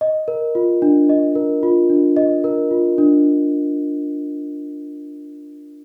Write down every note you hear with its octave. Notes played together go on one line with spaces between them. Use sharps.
D#5
A#4
F4
D4
D#5
A#4
F4
D4
D#5
A#4
F4
D4